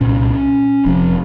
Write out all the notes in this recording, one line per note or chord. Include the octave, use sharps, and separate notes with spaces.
C2 A#2 C#4
F1 F2 C3